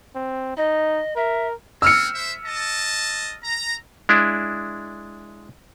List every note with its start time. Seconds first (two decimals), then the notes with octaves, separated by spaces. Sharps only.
0.16 C4
0.57 D#4 D#5
1.16 A#4 E5
1.82 G#3 C4 E6 F6 C#7
2.15 C5 E5
2.46 D#5 A5
3.44 A#5
4.09 G#3 D4 E4